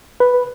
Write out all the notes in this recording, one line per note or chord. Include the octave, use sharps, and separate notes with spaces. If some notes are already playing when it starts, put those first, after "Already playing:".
B4